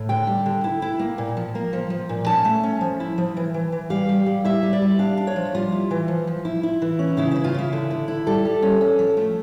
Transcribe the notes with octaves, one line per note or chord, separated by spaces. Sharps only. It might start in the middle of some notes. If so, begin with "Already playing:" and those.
Already playing: A2
D3 G5
G3
D3
E4
E4
A#3
A#2
F3
A#3
F3
F3
A#2
C#4 A5
A3
C#4
F3
E4
F3
E3
E3
E3
G3 F5
G3
G3
E4 E5
G3
D5
G3
D4 F5
D4
C#5
F3
G3 F4
E4
E3
F3
F3
E4
E4
E3
C#4
C#3 E4
C#3 E4
F4
C#3 E4
D3
D3
E4
G3 A4
G3
C#4
C#4
F3
A3